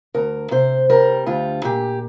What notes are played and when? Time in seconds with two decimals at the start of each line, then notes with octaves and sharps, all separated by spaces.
0.14 D2 A#4
0.51 C3 C5
0.89 G3 A#4
1.26 D2 F4
1.64 A#2 G4